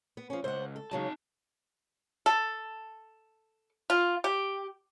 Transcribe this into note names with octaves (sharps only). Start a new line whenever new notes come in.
B3
F3 C#4
C#2 C5 F#5
A4
C#3 F#3 G#3 D#4 A5
A4
F4
G4